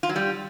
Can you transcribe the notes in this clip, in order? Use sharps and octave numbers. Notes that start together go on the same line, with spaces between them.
F4
F#3
G3